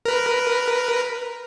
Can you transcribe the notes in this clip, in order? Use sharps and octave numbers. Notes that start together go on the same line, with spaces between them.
A#4 B4